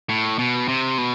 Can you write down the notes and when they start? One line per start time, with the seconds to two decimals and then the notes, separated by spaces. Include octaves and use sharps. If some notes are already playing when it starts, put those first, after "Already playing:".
0.09 A2
0.39 B2
0.68 C3
0.98 B2